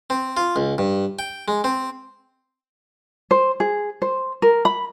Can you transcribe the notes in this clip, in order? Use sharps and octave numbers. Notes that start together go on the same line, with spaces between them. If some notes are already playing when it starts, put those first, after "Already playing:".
C4
F4
C#2
G2
G5
G#3
C4
C5
G#4
C5
A#4
B5